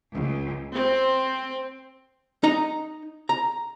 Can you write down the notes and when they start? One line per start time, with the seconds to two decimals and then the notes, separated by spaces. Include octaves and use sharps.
0.12 C#2
0.73 C4
2.43 D#4 A#5
3.29 A#5